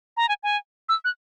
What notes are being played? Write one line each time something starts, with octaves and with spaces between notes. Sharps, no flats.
A#5
G#5
G#5
E6
F#6